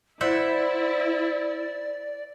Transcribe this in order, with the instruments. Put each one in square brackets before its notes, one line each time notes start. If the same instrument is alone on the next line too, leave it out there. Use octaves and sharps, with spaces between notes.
[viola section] E4 [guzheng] C5 E5 F#5 [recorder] D5